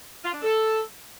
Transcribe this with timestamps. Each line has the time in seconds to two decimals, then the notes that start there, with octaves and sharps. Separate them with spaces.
0.23 F4
0.33 D4
0.42 A4